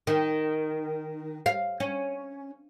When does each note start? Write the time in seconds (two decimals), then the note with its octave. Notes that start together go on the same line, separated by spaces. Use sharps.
0.07 D#3
1.46 F5
1.80 C#4